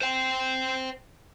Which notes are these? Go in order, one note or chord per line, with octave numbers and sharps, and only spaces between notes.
C5 G5